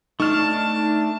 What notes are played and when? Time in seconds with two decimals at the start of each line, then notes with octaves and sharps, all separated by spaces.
0.20 A3 D4 D#4 A5 C#6 F6